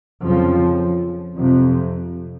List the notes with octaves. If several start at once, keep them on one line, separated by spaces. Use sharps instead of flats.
F2 C#3 F3
F2 C3